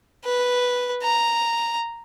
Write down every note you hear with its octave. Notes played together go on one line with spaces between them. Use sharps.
B4
A#5